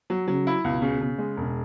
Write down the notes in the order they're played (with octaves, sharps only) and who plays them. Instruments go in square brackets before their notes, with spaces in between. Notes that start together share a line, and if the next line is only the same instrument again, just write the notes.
[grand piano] F#3
[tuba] C#3 [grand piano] F#3
[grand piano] E4
[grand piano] C#2 [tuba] B2
[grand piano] C#3
C#3
G#3
E1